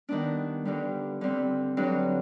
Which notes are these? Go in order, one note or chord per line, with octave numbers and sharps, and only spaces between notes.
D#3 G3 B3 D4
G2 D3 G3
D3 G3 C4
G2 D3 F#3